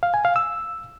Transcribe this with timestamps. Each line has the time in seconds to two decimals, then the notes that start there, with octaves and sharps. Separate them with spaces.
0.03 F5
0.14 G#5
0.25 F5
0.36 E6